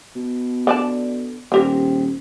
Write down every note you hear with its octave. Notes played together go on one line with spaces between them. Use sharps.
B2
D3 D5 A5
D#1 C4 G4 A#4